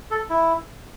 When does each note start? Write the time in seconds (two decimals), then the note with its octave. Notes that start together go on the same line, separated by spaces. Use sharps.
0.11 A4
0.30 E4